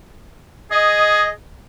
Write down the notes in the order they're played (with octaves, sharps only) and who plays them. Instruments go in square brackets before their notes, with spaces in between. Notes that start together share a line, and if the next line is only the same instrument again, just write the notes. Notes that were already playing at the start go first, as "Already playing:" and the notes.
[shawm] G#4 [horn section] D#5